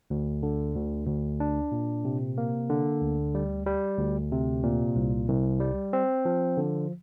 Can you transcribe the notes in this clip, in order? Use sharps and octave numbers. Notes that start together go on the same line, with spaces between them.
D2
D3
D2
D2
D4
A#2
C3
A#3
D3
D2
G3
G3
D2
C3
A#2
C2
C2
G3
C4
F3
D3